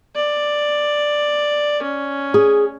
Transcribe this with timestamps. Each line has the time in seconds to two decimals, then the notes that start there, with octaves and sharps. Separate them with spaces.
0.16 D5
1.82 C#4
2.34 G#4